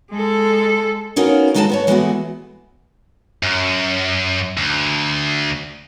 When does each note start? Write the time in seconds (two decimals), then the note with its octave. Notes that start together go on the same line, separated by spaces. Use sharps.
0.11 G#3 A4
1.16 B3 C#4 D#4 F#4 A#4 F5
1.54 D#2 G#3 D#4 F#4 A4 A5
1.70 B3 F#4 C#5
1.87 E3 G#3 A3 B3 E4 F#4
3.43 F#2
4.57 D2